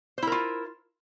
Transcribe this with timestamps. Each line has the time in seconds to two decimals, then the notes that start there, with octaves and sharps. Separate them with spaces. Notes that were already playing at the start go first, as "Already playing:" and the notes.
0.18 C5
0.22 E4
0.27 A#4
0.32 F4